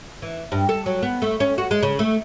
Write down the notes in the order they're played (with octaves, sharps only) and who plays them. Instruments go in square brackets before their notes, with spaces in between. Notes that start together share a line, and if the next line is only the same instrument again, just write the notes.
[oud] E3
G2
A4
F#3
B3
A3
C#4
F#4
G#3
C#3
A3